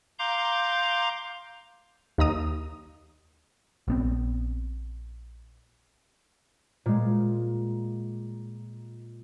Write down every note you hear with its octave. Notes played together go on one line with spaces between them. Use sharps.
F5 A#5 C6 D6 G6
D#2 D#3 A#5 D#6
A#1 B3 C4
A#2 G#3